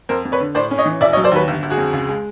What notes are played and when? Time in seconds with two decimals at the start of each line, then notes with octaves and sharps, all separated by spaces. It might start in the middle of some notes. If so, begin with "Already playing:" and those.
0.09 F2 A#4 C5
0.25 F2
0.32 B4 C#5
0.40 D3
0.55 A2 C5 D5
0.71 C#4
0.78 C#5 D#5
0.86 E3
1.01 E1 D5 E5
1.13 C#5 D#5
1.17 F#3
1.24 C5 D5
1.31 D#2 B4 C#5
1.48 G1
1.63 G1
1.70 F#4 G#4
1.78 F2
1.93 C#2
2.09 G#3